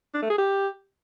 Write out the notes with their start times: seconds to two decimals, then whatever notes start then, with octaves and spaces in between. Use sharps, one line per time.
0.14 D4
0.22 A3
0.30 G#4
0.38 G4